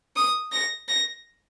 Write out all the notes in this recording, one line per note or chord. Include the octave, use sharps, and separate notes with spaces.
D#6
A#6
A#6